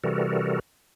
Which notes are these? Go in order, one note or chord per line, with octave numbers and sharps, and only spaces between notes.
C3 E3 G3 F#4 A4 A#4